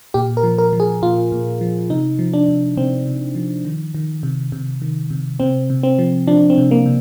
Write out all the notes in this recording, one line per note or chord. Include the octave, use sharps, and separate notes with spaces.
A#2 G4
A#4
F3
A#4
F3
G#4
A#2 F4
A#2
F3
C3 D#4
F3
D4
C3
C3 C4
C3
F3
D#3
D#3
C3
C3
D#3
C3
C3 C4
C3
C4
F3
F3 D4
C4
C3
A#3
C3